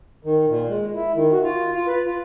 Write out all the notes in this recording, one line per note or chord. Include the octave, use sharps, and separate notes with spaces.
D#3
A#2
G#3
E4
D#3
F#4
F4
F4
B4
F4